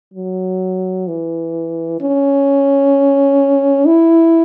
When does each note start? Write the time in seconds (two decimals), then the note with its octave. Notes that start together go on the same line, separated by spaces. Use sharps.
0.14 F#3
1.08 E3
2.01 C#4
3.86 E4